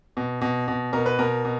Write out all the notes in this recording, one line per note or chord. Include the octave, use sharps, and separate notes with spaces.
B2
B2
B2
B2 A#4
B4
B2 A#4
B2